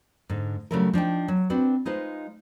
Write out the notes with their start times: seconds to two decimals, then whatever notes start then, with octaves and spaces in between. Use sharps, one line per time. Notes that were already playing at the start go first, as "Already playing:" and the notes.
0.29 G#2 D3
0.71 C#3 F#3 G3 A3 E4 A#4
0.93 F3 D4 D#4 G5
1.28 F#3
1.50 C4 D4 F#4 B4
1.85 G#3 D#4 F4 B4 C5